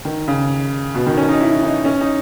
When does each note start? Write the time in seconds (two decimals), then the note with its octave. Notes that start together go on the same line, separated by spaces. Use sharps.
0.05 D#3
0.28 C#3
0.95 B2
1.07 D#3
1.18 C#4
1.29 D#4
1.40 E4
1.52 E4
1.63 D#4
1.85 C#4
2.01 D#4